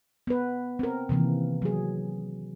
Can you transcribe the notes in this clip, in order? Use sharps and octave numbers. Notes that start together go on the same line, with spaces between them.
B3 B4
C4 A#4
C3 D#3 E3 A#3
F#3 G#4